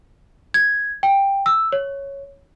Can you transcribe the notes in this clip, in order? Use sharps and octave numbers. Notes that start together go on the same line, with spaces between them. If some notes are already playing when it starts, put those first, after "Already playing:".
G#6
G5
E6
C#5